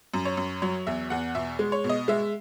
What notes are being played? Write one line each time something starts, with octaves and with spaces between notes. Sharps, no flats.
F#2
C#5
F#2
F#3 C#5
E2 E5
E2 F#5
B2 E5
G#3
C#5
B2
D#5
G#3 E5